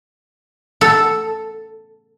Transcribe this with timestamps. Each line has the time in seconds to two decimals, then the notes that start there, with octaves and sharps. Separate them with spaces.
0.81 A4